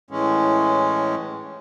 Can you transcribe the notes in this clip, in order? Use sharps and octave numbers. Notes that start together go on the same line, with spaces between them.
A2 E3 G#3 C#4